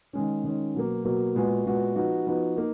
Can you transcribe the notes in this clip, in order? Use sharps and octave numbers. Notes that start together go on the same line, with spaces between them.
D#3 G#3 C#4
D#3 G#3 C#4
B2 F#3 A#3
B2 F#3 A#3
A#2 G#3 B3 F#4
A#2 G#3 B3 F#4
F3 B3 D#4 F#4
F3 B3 D#4 F#4
A#3 D#4